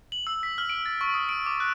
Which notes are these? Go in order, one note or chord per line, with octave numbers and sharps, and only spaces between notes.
F#7
E6
B6
F6
D7
A6
C#6
D#6
D7
D6
F#6